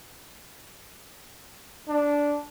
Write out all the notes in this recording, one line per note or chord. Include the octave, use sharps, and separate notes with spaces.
D4